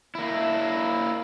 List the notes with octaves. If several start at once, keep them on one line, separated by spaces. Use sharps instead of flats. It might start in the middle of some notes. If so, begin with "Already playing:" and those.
A#3 E4